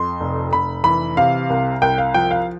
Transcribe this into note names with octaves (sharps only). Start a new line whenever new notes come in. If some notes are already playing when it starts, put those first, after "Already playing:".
Already playing: F2 C6
F1
F1 B5
E3 B5
C3 F5
C2
C2 G5
F5
F3 G5
F5